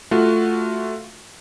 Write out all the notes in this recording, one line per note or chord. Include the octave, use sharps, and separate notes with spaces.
A3 F4 F#4